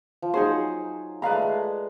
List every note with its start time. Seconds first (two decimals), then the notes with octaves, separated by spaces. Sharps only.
0.22 F3
0.34 F#3 D#4 G#4 C5
1.22 G#3 B4 D5 F5 A#5
1.32 A3
1.42 G#3